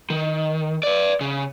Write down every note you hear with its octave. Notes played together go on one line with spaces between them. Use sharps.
D#3
B4 D5
C#3